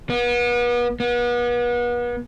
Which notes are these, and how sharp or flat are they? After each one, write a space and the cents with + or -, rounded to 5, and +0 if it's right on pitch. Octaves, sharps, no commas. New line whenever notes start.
B3 -35
B3 -35